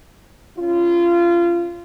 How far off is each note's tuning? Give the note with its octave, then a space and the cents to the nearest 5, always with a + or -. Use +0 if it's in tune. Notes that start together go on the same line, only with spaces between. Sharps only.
C#4 -5 F4 -25